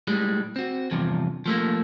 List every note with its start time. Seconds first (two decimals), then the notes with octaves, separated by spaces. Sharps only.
0.07 A2 G3 G#3
0.56 C4 F#4
0.91 E2 G2 C3 F3
1.46 F3 A3 A#3